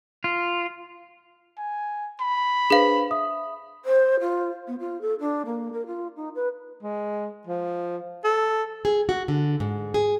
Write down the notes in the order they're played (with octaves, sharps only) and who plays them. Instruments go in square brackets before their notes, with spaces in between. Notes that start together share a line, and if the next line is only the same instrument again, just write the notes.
[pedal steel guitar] F4
[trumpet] G#5
B5
[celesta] D4 B4 C5 [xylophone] G#4 F5
[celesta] E5 D#6
[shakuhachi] C5
F4
B3
F4
A4
D4
A#3
A#4
F4
D#4
B4
[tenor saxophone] G#3
F3
A4
[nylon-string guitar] G#4
F#4
D3
G#2
G#4